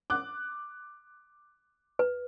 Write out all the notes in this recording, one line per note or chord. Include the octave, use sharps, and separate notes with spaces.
D6 F#6
B4